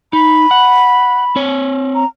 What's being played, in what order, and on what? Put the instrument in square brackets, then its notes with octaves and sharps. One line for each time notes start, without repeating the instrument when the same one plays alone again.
[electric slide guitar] D#4 [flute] B5
[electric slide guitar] F#5
C4 C#5
[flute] A#5